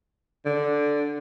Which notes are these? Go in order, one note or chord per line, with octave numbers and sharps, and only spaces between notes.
D3